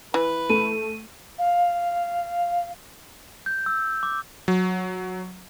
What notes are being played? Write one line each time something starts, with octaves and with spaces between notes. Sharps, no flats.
E3 B4
A3 D#7
F5
G6
E6
D6
F#3